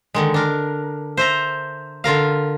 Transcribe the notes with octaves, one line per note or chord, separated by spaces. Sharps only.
D3 D#3 G#3
D4 A#4
C5 E5 A#5
D3 F4 A#4 F5